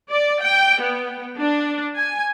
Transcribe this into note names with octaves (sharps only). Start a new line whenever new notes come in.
D5
G5
B3
D4
G#5